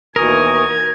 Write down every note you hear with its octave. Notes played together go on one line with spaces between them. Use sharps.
D#2 B2 E3 A#4 G#5 C#6 D#6 G#6